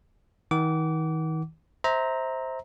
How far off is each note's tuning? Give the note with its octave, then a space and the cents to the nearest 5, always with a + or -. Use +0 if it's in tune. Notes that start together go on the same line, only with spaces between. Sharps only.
D#3 +40 F#5 +25 D6 -25
C5 +5 E5 -30 A#5 +0